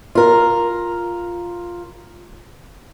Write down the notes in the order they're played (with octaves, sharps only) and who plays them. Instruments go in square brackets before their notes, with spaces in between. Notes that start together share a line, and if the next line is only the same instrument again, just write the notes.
[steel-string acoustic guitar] F4 A#4